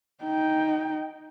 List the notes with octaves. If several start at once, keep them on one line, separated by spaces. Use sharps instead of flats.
D#4 G5